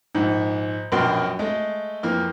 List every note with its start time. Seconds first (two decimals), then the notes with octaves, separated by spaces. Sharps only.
0.15 A#1 G#2
0.92 A#1 F#2 B2 A#4 G5 C6
1.39 G#3 A3
2.03 F2 E3 A#3 F6